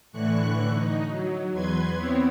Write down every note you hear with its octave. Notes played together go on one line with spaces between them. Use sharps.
A2 D3 E3 C#6 F#6
D#4
F#3
E2 B4 C6 G#6
B3 C4 E4 C#5